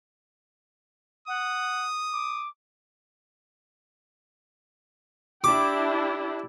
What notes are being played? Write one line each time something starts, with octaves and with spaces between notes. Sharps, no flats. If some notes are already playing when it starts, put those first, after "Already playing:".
F#5 D#6
D6
D4 E4 G4 D6